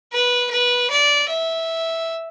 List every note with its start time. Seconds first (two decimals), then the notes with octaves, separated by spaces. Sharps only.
0.13 B4
0.51 B4
0.91 D5
1.30 E5